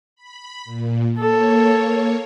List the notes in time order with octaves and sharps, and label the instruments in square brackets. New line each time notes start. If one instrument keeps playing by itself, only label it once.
[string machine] B5
A#2
[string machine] A#3 C#5 [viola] A4